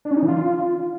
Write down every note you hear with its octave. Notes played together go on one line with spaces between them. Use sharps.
D4
C#4
D#4
E3
F4